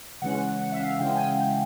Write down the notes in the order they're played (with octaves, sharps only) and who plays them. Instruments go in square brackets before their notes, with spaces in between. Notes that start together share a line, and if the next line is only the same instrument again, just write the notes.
[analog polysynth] C#3 E3 G#3 C#4 F#5
F#5
E5
F5
C#3 E3 G#3 C#4 G5
G#5
G5